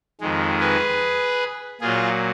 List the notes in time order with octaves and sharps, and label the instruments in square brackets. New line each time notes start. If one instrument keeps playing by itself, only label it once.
[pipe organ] F2 D#3 G#3
G#4 B4
A#2 F#3 F4 G#4